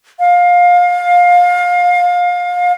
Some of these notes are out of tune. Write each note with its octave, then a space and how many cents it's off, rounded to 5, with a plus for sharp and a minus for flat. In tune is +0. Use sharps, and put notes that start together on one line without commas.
F5 +25